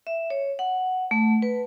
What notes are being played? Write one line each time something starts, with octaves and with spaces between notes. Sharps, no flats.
E5
C#5
F#5
A3
B4